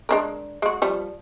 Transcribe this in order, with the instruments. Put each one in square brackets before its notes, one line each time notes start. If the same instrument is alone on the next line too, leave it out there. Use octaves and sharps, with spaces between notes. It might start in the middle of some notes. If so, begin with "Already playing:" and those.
[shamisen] G#3 D4 A#4
G#3 F#4
F3 G3